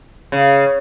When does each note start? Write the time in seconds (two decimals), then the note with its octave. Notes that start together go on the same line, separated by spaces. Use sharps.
0.32 C#3